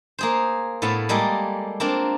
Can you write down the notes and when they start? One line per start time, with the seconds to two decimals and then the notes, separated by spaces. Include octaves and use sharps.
0.19 A#3 G#4 C5
0.82 A2 B3 A4 F5
1.09 G3 G#3 A#3 G#4 A4
1.80 A#3 C4 D4 F4 A#4